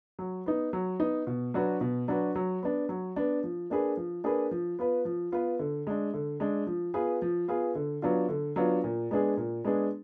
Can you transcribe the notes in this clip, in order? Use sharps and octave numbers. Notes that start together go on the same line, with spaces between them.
F#3
B3 D#4
F#3
B3 D#4
B2
F#3 D4 F#4 B4
B2
F#3 D4 F#4 B4
F#3
B3 D4
F#3
B3 D4
F3
A#3 D4 G#4 B4
F3
A#3 D4 G#4 B4
F3
B3 F4 B4
F3
B3 F4 B4
D3
G#3 D4
D3
G#3 D4
F3
B3 F4 G#4 B4
F3
B3 F4 G#4 B4
D3
F#3 B3 D4 F4
D3
F#3 B3 D4 F4
A#2
G#3 B3 D4 G#4
A#2
G#3 B3 D4 G#4